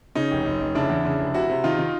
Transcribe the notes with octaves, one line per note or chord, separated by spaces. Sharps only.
C#3 C#4 D#4
F1
F1
F1
C#3 D4 E4
E2
C#3
F1
C3 E4 F#4
C3
D#3 D#4 F4
D#3